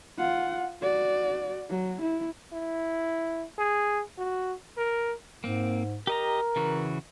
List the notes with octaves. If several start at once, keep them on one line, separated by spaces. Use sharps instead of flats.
F4 F#5
F#4 D5
F#3
E4
E4
G#4
F#4
A#4
G#2 A#3 C4
G4 A#4 D#5 A#5
C#3 E3 F#4